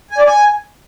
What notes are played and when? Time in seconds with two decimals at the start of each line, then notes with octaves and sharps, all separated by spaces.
0.11 G#5
0.18 D5
0.26 G#5